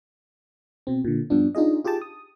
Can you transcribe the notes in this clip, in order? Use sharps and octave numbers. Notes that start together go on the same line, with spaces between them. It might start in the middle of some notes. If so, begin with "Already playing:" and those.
B2 C4
A#2 D3
G2 F3 B3 D4
D4 D#4 F4 G#4 D#5
F4 G4 G#4 G5 A5
D#6